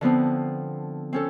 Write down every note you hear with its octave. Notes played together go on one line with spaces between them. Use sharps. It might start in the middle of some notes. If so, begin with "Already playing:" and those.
D3 F3 B3 C4
C4 C#4 A4